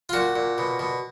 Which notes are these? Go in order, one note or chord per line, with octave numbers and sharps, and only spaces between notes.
F4
A#2 F#4
A#2
B2
B2